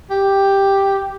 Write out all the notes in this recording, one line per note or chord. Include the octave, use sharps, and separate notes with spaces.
G4